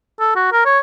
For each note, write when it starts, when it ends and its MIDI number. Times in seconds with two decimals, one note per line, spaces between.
0.20 0.35 69
0.36 0.52 66
0.53 0.61 70
0.66 0.79 73